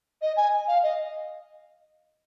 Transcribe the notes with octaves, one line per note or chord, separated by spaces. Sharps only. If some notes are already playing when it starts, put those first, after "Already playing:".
D#5
G#5
F5
D#5